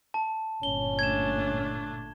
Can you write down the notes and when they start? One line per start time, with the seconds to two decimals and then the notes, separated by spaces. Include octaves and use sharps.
0.14 A5
0.63 G1 A#2 C#4 G7
0.99 A3 D4 G#6 E7